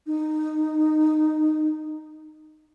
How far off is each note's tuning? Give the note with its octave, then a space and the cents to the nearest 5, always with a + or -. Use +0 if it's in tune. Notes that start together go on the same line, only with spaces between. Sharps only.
D#4 -15